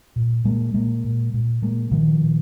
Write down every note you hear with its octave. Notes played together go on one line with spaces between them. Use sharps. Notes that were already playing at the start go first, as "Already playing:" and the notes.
A#2
A#2 G#3 A#3
A#2 G#3 A#3
A#2
A#2
A#2 G#3 A#3
A#2 D#3 F3
A#2